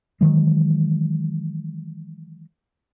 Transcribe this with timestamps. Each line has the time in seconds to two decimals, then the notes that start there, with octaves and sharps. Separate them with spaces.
0.21 D#3 E3 F#3 G#3